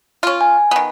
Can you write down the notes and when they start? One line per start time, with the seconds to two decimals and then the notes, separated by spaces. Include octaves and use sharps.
0.23 C#4 F4
0.41 G#5
0.71 D#3 B3